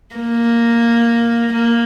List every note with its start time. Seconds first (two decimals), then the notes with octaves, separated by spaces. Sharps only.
0.15 A#3
1.53 A#3